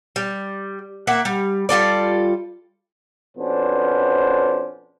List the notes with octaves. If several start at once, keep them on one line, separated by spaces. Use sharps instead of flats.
G3
A#3 E5 F#5
G3
G3 F4 A4 D5
F2 B2 B3 C#4 D4 C5